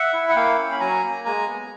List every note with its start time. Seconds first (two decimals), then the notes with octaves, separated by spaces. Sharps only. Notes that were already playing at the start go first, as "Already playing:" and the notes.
Already playing: E5 F#5
0.13 E4
0.29 F#5
0.36 A#3 F5 G5
0.58 C#4
0.72 B5
0.80 F#3 G#5 A#5
1.03 A#3
1.25 G#3 G#5 A#5
1.47 B3